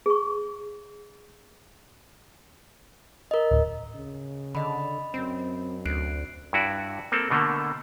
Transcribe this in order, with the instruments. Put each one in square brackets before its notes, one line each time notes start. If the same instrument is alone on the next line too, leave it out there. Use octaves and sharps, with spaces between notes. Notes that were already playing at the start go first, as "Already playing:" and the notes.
[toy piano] G#4 C#6
[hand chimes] A#4 D#5
[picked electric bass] D1
[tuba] C#3
[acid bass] D3 [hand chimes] D#5 B5
[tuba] F#2 [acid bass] C4
[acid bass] D2 [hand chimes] F#6 C7 D7
[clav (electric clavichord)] G2 E4 F#4 D5
A#3 C4 A4
B2 D3 A3 A#3